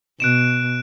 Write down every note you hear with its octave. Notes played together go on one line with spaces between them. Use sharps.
B2 F#6 D7 E7